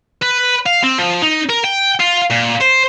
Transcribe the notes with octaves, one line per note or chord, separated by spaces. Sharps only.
B4
F5
C4
F3
D#4
A#4
G5
F4
A#2
C5